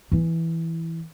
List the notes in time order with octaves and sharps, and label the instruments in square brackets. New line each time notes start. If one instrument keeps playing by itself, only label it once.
[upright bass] E3 E4